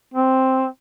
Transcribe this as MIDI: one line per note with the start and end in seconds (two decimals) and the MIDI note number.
0.14 0.66 60